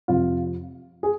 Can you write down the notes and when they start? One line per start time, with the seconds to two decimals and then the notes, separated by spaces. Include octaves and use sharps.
0.08 F2 C3 F3 F4
1.03 G#4